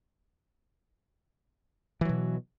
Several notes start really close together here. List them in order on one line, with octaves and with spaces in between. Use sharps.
E3 F#3 B2